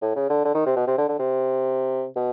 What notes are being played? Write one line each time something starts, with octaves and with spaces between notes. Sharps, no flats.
A2
C#3
D3
D3
D#3
C3
B2
C3
D3
D3
C3
B2